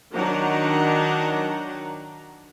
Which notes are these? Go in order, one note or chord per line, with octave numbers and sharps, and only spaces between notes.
D#3 F#3 D4 D#4 F#5 A#5